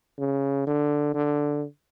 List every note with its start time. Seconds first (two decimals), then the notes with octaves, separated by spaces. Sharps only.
0.19 C#3
0.67 D3
1.15 D3